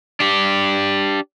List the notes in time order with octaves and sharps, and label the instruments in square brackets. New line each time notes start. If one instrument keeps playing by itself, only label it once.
[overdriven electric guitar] D4 G4